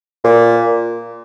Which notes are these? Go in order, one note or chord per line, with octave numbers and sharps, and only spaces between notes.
A#2